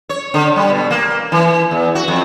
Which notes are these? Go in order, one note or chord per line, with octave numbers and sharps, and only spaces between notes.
C#5
D3
G3
B2
A#3
E3
E2
F#4
F2